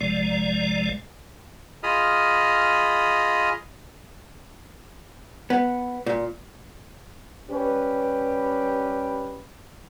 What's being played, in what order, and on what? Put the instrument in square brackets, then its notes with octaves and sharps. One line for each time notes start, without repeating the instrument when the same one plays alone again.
[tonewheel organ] A#1 C3 F3 G#3 D5
[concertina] F4 G#4 D#5 B5 D#6 F6
[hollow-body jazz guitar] B3
A#2
[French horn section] G3 C#4 G4 B4